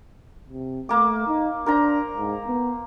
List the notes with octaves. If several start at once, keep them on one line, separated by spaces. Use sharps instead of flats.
C3
A3 A#3 D6
D#4
D4 A#4 C5 A#5
G#2
B3